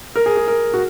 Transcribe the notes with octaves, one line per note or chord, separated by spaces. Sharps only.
A#4
G#4
G#4
A#4
F#4